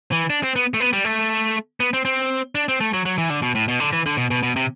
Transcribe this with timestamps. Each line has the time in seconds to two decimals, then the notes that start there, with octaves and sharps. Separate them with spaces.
0.12 E3
0.30 D4
0.43 C4
0.56 B3
0.74 A3
0.80 B3
0.93 G3
1.05 A3
1.80 B3
1.93 C4
2.05 C4
2.55 D4
2.68 C4
2.81 A3
2.93 F#3
3.06 F#3
3.18 E3
3.30 D3
3.42 B2
3.55 A2
3.68 B2
3.80 D3
3.93 E3
4.06 D3
4.17 B2
4.30 B2
4.43 B2
4.56 C3